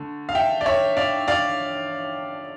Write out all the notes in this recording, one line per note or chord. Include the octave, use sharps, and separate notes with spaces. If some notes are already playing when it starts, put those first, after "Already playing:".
Already playing: D3 A3
F5
E5 G5
D5
C#5 E5
D5 F5
D5 F5